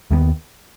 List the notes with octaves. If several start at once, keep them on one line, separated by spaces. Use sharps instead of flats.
D#2 D#3 G#3 B3